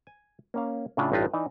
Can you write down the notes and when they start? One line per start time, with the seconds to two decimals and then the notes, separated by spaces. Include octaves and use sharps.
0.07 G#5
0.54 A#3 C#4 F5
0.97 A2 C#3 D4 E4 F4
1.12 A1 G2 D#4 F4 B4
1.33 E3 D#4 D5